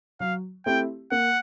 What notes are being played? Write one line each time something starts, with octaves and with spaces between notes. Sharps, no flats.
F#3 F5
A3 C4 E4 G4 G5
A#3 F#5